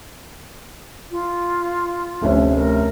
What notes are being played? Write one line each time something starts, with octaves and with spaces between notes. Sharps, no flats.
F4
F1 D2 C#4
A#4